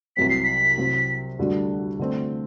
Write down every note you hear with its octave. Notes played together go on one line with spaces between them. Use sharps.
C2 C3 F#3 C4 B6
C7
B6
C3 F#3 C4
D2 D3 G3 D4 F#4
D3 A3 C4